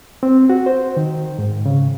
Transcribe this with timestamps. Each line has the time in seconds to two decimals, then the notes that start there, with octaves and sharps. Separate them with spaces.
0.23 C4
0.50 F#4
0.66 C5
0.97 D#3
1.39 G#2
1.66 C#3